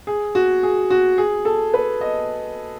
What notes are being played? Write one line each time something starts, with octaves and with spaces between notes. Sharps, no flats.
G#4
F#4
G#4
F#4
G#4
A4
B4
D#5